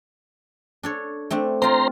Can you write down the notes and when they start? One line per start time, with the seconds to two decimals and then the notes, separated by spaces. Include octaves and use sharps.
0.83 D4 A4 C#5
1.31 A3 C4 D4
1.62 C4 F4 C5 A#5 C6